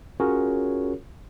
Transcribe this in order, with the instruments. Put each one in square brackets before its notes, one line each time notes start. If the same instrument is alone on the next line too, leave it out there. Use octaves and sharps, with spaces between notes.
[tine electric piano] C#4 F4 F#4 G#4 A#4 C#5